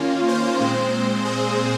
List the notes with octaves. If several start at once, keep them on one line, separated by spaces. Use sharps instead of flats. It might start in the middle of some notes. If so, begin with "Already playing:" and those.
Already playing: D#3 A#3 C#4 F4
C5
A#2 G#3 C4
G#4